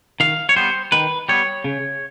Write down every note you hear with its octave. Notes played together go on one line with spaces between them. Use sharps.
D#3 F5
C#5
G3 B3 C5
D#3 B4
G3 B3 C#5
C#3